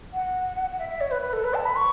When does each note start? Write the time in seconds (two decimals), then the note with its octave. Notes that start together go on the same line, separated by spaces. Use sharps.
0.13 F#5
0.70 F#5
0.78 E5
0.89 E5
1.00 C#5
1.11 B4
1.22 B4
1.33 A4
1.44 B4
1.54 A5
1.65 B5
1.76 C#6